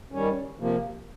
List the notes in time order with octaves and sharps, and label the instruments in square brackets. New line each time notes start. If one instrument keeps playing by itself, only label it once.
[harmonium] D#3 G3 C#4
C3 F3 A#3